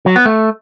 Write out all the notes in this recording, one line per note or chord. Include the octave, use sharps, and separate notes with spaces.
F#3
B3
A3